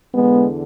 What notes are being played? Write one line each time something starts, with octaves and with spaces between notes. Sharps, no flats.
E2 D3 G#3 B3